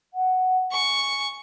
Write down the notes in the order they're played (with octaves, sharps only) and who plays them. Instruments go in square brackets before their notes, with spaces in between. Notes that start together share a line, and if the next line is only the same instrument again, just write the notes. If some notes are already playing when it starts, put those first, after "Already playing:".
[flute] F#5
[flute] G#5 [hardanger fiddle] C#6